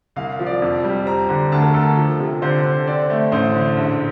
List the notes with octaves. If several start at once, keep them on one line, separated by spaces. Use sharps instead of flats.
C2 F5
F3
D5
F2
G3
C4 A#5
D3
D2 A5
A#4
D2 A4
F3
C3
D3 C5
D3
C4 D5
A3
A1 C5
D3
A#1